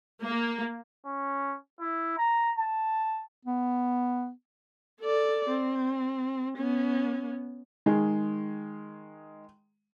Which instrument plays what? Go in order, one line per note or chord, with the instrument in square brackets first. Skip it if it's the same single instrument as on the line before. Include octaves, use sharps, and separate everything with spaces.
[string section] A#3
[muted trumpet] C#4
E4
A#5
A5
[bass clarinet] B3
[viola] A4 D5
C4
B3 C#4
[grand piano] D#3 G#3 G#4